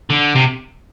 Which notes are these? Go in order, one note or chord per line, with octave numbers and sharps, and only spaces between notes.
D3
C3